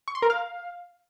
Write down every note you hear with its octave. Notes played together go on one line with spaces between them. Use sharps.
C#6
C6
A#4
F5